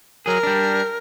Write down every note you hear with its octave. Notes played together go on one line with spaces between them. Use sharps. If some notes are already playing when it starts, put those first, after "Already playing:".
F#3 G#4 A#4
G3 D4